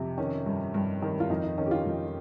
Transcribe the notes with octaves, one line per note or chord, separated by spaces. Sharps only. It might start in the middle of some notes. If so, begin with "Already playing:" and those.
Already playing: F2 C3
D#3 C#4
G2
G2
D#3
F4
F2 D#4
D#4
D#3 C#4
G4
F4
F2